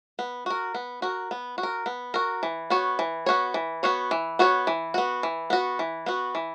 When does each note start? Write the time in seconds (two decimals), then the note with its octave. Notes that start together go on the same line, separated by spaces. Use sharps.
0.19 B3
0.46 F#4 A#4
0.74 B3
1.02 F#4 A#4
1.31 B3
1.58 F#4
1.63 A#4
1.86 B3
2.14 F#4 A#4
2.43 E3
2.70 B3 F#4 C#5
2.99 E3
3.26 B3 F#4 C#5
3.54 E3
3.83 B3 F#4 C#5
4.11 E3
4.39 B3 F#4 C#5
4.67 E3
4.94 B3 F#4
5.23 E3
5.50 B3 F#4
5.79 E3
6.06 B3 F#4
6.35 E3